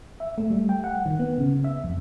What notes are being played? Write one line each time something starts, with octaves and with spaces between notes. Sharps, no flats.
E5
A3
G3
G5
F#5
D#3
B3
C#3
E5
F2